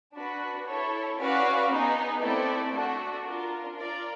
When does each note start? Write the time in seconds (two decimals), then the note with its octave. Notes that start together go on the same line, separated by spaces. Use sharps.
0.14 D4 F#4 B4
0.66 E4 A4 C#5
1.18 C#4 F#4 B4 D5 F5
1.70 B3 D#4 G#4
2.21 A3 C4 E4 A4 D5
2.72 A3 D4 F#4 A4
3.24 D4 F4 A#4
3.76 F4 A#4 D5